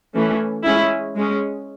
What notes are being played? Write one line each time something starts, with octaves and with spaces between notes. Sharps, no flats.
E3 A3 C#4
G#3 C#4 E4
G#3 C#4